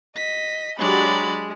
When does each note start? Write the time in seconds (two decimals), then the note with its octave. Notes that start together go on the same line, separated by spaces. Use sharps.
0.16 D#5 B6
0.79 F#3 G#3 D4 F#4 G4 D5 B5